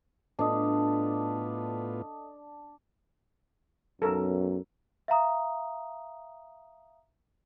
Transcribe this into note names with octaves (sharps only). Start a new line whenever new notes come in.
A2 B3 D4 F4 A4 D#5 D#6
B1 F#2 A4 A#4
E5 F5 A#5 D#6